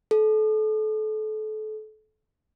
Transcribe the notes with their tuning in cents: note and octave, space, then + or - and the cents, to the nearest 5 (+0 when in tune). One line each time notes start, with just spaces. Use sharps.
A4 -30